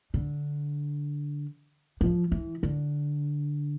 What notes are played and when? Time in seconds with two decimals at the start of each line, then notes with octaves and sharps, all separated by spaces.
0.14 D3
2.01 F3
2.32 E3
2.63 D3